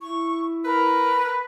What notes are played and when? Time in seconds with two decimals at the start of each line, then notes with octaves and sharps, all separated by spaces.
0.01 E4 C#6
0.64 A#4 B4